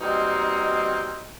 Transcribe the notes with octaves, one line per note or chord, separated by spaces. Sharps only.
B2 G3 A#3 C4 D#4